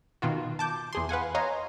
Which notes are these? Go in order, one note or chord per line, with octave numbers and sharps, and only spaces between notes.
B2 D#3 F4 F#4
A5 D6 G6
E2 G#4 C6
B4 F5 F#5 G#5
C#5 D#5 F5 G#5 A#5 C6